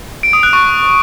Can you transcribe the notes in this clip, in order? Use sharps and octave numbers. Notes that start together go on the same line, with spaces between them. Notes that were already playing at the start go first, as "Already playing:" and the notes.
D7
D#6
F#6
C#6